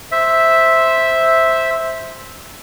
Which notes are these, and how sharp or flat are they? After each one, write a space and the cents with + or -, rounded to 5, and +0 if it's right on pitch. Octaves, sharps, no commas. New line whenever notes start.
C5 +0 E5 -5